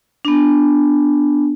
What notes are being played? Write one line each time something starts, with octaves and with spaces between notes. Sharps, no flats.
B3 D4